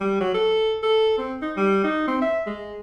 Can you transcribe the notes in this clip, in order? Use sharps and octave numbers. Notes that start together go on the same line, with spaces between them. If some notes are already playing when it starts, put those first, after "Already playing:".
G3
F#3
A4
A4
C4
D#4
G3
D#4
C4
E5
G#3